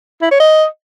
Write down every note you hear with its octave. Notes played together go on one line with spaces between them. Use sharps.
E4
C#5
D#5